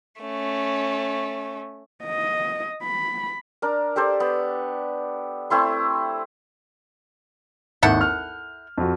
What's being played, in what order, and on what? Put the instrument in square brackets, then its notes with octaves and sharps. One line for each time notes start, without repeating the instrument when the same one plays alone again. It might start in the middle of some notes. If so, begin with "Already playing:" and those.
[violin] A3 C#4
[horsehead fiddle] D#5
B5
[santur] D4 A#4
G4 A4 C5 D5
B3
A3 C4 E4 C6
[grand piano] G#1 D#2 G6 [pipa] E4 A4 F#5
[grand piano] F6
F2 F#4